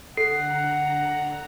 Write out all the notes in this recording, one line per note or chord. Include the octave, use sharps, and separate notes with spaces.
D3 A4 F#5 A#5 C7